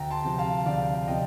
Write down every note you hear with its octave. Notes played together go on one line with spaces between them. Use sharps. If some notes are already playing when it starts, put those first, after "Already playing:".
Already playing: D2 G5 A#5
A5 C6
C3 F3
F5 A5
D2 D5 F5
C3 F3 D#5 G5